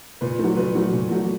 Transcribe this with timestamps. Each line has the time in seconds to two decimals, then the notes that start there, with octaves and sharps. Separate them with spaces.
0.21 A#2 B4
0.39 A3
0.44 F#3
0.57 A#2 B4
0.75 F#3 A3
0.93 A#2
1.11 F#3 A3